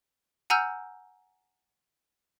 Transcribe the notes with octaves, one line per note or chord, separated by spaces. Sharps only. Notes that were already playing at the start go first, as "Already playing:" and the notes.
F#5 G#5 A#5 E6 F6 G6